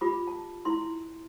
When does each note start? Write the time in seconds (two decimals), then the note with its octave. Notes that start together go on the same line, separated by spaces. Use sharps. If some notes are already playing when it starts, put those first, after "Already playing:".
0.01 F4 G4 B5 D6
0.27 A5
0.65 E4 C6